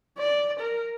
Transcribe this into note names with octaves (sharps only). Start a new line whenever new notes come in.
D5
A#4